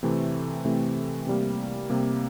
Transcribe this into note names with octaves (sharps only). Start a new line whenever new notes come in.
C3 E3 A3 C4
C3 E3 A3 C4
C3 G3 A#3
C3 G3 A#3